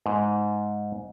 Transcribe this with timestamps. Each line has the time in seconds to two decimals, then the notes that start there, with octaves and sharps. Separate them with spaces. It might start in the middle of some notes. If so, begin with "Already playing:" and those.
0.06 G#2